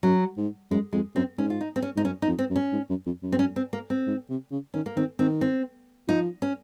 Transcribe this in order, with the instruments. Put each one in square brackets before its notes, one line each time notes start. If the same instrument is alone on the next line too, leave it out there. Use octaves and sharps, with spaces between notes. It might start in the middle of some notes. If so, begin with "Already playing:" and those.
[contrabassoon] F#2 [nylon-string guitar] F#3
[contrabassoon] G#2
[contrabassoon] F#2 [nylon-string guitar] G#3
[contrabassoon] F2 [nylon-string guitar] G#3
[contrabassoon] F#2 [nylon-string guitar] C4
[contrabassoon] G#2 [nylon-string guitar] C#4
[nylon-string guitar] F4
D#4
C4
C#4
[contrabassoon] G#2 [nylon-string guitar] D#4
[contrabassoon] F#2 [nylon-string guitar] C#4
[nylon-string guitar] D#4
[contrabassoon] F2
[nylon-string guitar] C4
[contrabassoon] F#2
[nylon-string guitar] C#4
[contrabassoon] G#2
F#2
F2
F#2
[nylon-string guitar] C4
C#4
C4
A#3
C4
[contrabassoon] G#2
C3
C#3
[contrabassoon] D#3 [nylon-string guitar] C#4
[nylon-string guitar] A#3
[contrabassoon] D#3 [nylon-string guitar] C4
[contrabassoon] D#3 [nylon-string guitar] C4
[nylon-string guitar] C4
[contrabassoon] F3 [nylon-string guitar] D#4
[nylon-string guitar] C#4